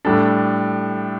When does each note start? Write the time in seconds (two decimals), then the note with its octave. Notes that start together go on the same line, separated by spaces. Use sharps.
0.05 A2 G3 D4 A4